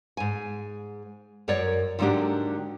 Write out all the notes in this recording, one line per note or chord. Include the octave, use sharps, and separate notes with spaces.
G#2 G#5
F#2 A#4 C#5 D5
G#2 D3 F#3 A#3 D4 G4